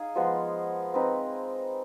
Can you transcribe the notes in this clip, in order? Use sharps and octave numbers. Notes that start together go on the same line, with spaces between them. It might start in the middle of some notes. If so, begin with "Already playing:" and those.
Already playing: D#4 G#4 F5
F3 G#3 B3
C4 D#4 B4